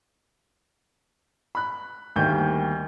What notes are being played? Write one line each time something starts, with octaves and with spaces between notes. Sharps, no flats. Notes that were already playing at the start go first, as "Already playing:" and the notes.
B5 F#6
D2 D#3 G3 A#3 G6